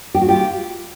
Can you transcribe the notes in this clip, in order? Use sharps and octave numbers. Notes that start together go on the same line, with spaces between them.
G4
F#4
F4 G4